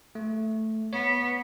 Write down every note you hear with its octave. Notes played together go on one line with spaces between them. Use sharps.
A3
B3 C#5